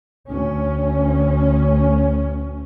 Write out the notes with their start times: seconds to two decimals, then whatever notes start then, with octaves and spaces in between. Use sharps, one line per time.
0.28 D2 C#4